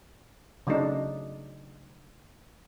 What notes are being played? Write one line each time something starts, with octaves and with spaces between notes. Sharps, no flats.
C#3 F#3 A3 D4 D#4